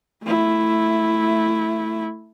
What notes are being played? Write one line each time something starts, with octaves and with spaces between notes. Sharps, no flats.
A3 E4